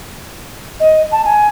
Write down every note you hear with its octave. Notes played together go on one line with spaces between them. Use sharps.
D#5
A5
G#5